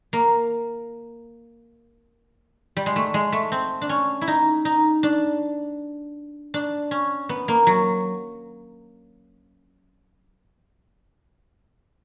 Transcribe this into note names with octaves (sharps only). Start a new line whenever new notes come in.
A#3
G3
G#3
A3
G#3
A3
C4
D4
C#4
E4
D#4
D#4
D4
D4
C#4
B3
A#3
F#3